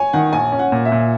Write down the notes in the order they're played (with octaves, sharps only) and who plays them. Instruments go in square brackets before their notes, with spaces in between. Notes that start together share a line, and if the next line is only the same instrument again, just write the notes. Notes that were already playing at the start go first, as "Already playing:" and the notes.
Already playing: [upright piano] C#5 G#5
[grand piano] D#3 [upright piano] F#5
[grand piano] A#1 [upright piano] G#5
[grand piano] C#4
[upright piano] F#5
[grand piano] A#2
[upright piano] E5
[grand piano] A#2